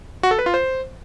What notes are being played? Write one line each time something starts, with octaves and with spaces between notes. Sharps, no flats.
F#4
A4
B4
F4
C5